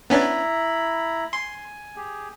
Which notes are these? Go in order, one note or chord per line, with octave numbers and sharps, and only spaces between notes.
B3 C#4 D4 E4 A#5 B5
G#5 C6
G4 G#4